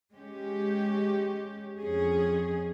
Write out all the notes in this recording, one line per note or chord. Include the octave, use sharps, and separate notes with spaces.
G#3 C#4 G4
F2 C#4 G#4